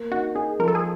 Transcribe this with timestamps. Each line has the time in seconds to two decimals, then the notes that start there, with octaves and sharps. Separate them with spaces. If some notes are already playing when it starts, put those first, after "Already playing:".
Already playing: A#3
0.12 D#4 F#4
0.35 D#4 G#4
0.59 F3 A#4
0.68 A4
0.75 G#4